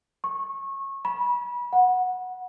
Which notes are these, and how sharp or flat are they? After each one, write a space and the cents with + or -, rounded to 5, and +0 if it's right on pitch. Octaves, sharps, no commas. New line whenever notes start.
C#6 -25
B5 -30
F#5 -10